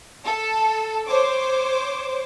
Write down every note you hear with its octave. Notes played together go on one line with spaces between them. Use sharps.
A4
C5 C#5 D6